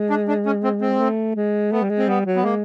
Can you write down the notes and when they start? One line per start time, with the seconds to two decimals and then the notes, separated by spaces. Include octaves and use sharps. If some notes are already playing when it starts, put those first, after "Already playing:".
Already playing: G#3
0.10 D4
0.28 D4
0.46 C#4
0.64 C4
0.81 C4
1.00 A3
1.36 G#3
1.72 A3 B3
1.82 G3
1.89 G#3
1.98 C4
2.07 G3 B3
2.26 F#3
2.36 B3
2.44 G#3 A#3